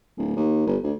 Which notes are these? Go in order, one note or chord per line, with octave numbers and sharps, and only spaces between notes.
D1
D#2
G1
D2